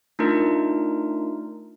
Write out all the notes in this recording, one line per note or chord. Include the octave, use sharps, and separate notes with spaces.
A3 D4 D#4 F4 A#4